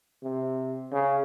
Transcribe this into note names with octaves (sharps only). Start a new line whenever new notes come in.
C3
C#3